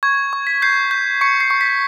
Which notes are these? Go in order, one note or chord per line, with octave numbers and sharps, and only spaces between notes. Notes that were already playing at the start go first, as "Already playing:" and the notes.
C#6 G#6
C#6
B6
G6 C7
G6
C#6 C#7
C7
C#6
B6